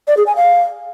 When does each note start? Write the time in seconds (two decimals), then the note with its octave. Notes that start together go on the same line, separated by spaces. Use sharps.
0.08 D5
0.17 G#4
0.27 G#5
0.36 F5